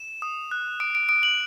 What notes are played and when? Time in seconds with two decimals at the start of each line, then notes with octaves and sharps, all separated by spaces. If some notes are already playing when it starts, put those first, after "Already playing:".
Already playing: E7
0.22 D#6
0.51 F#6
0.80 D#6 D7
0.95 D7
1.09 D#6 D7
1.23 F#7